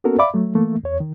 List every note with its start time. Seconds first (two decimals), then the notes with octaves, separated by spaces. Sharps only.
0.04 A#3 B3 C#4 F#4 A4 A#4
0.19 D5 E5 F5 B5 D6
0.34 F#3 A3
0.55 E3 A3 A#3
0.84 E2 C#5
1.00 D#3